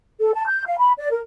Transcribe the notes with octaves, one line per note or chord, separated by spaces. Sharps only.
A4
A5
G6
F5
B5
D5
A#4